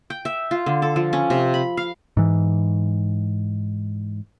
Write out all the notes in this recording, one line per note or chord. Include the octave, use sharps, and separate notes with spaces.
G5
E5
F4
D3
A4
F3
C#4
C3
B5
F5
G#2 E3